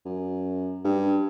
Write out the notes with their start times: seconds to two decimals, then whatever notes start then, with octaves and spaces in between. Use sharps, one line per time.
0.05 F#2
0.84 G2